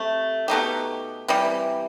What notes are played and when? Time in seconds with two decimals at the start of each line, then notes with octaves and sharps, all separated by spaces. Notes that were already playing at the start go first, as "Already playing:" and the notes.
Already playing: C3 A3
0.48 B2 A3 D#4 G4
1.28 C3 E3 G3